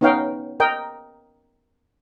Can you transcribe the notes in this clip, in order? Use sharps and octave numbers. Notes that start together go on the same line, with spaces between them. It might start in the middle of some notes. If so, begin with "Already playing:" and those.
B3 C#4 D#4 C#5 F5 G5
A#4 D#5 G5